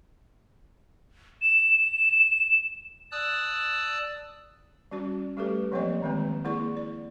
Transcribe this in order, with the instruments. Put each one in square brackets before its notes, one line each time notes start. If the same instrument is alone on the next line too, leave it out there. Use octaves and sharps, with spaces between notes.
[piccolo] E7
[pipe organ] D5 A5 D#6 E6 F#6
[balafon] G3 C#4 F#4 D5
G3 A3 G4 A4 B4
F3 F#3 A#3 C4 C#5 D#5
D#3 E3 G#3 A#3 C4
A#3 E4 G#4 D5 C#6
D5